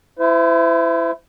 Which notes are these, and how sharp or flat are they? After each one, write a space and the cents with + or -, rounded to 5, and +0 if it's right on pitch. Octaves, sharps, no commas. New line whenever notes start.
E4 +15 C5 -40